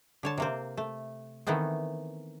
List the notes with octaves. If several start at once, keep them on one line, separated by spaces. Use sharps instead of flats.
D3 C#5 A5
C3 A#3 C4
A3
D#3 E3 A3 B3 C4